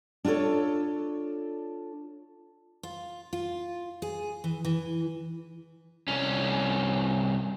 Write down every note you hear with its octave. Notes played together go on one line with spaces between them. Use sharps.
D4 F4 F#4 A4 C#5
F4
F4
G#4
E3
E3
C2 C#4